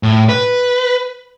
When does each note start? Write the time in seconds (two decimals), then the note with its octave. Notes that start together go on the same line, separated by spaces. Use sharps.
0.03 A2
0.29 B4